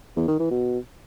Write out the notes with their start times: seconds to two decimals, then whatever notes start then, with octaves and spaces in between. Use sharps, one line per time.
0.16 E2
0.28 D#3
0.39 E3
0.51 B2